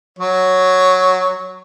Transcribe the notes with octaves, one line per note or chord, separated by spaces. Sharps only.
F#3 C#5